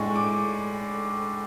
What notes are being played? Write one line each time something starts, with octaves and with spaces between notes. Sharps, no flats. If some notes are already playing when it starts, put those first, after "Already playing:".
Already playing: A2 G#3 D4 C#6
D6